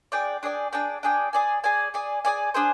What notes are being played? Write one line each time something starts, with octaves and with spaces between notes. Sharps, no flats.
D4 G#4 D5 G5
D4 G#4 D5 G5
D4 G#4 D5 G5
D4 G#4 D5 G5
G#4 D5 G#5
G#4 D5 G#5
G#4 D5 G#5
G#4 D5 G#5
D4 G#4 C5